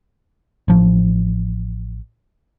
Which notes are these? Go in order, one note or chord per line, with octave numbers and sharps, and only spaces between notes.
A1 F3